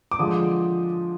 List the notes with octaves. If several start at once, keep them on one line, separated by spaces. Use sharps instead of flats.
D6
D3 F3 G#3 D#6